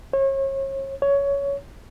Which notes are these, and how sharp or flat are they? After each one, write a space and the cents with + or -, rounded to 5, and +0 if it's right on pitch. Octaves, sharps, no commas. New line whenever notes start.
C#5 -35
C#5 +15